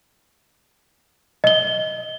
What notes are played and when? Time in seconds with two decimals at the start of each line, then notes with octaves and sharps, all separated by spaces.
1.44 D#5 G7